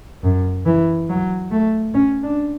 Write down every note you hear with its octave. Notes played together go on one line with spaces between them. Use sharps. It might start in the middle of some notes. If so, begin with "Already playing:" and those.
F#2
E3
F#3
A3
C#4
D4